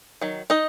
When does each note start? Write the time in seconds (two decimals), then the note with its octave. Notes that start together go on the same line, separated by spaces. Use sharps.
0.21 D#3 F#3
0.50 D#4 D#5